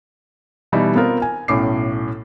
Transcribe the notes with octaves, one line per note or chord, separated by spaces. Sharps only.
B2 E3 G3 D#4 E4
B3 C4 F4 A#4
G#5
B1 A2 C#4 D6 C7